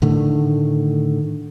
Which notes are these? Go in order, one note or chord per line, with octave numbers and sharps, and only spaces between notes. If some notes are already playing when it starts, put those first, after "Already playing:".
A2 D3 D#3 A3